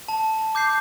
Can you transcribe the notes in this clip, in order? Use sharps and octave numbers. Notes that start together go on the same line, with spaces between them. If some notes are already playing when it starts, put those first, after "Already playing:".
A5
D6 G6 C7